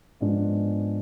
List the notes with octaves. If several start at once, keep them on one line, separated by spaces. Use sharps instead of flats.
G#2 F3 G#3 B3 D4